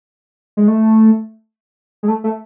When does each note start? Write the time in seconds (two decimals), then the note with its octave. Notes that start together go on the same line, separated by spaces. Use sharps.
0.57 G#3
0.68 A3
2.03 G#3
2.08 A3
2.24 A3